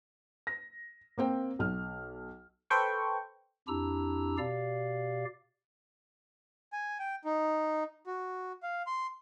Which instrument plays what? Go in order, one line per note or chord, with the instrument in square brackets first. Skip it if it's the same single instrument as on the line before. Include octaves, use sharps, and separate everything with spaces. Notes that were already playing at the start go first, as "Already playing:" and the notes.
[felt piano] A#6
A#3 C4 G5
B1 F6
[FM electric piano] A4 B4 C5 G5 C#6
[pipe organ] F2 D4 E4 G4 A#5 E6
B2 G4 D5 F5
[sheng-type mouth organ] G#5
G5
D#4
F#4
F5
C6